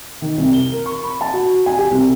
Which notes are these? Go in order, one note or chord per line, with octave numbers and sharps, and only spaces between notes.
D#3
C2
G7
A#4
C#6
B5
A5
F#4
G#5
G4
C2